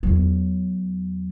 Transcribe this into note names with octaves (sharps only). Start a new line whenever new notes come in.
E2 F#3